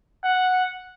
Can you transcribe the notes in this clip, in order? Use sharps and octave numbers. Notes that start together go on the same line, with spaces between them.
F#5